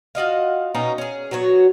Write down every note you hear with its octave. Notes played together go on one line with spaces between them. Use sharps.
F4 F#4 D#5 F5
B2 C#4 D#4 A#5
C#4 G#4
F#3 B3 F#4 C#5